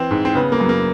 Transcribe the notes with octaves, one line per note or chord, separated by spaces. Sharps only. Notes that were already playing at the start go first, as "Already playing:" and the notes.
Already playing: E3 C4
G#2
C4
C#3 B3
A#3
F#2
A#3